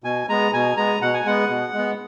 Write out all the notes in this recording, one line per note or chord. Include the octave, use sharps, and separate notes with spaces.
B2 G#5
G#3 B3 A#5
B2 G#5
G#3 B3 A#5
B2 F#5
G#5
G#3 B3 F#5
B2
G#3
B3